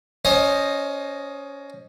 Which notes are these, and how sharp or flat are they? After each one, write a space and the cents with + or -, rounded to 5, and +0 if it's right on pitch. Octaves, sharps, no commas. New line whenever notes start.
C#4 +15 C5 +30 D#5 +0